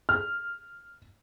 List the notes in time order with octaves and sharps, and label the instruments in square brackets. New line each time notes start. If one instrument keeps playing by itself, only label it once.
[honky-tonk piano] F6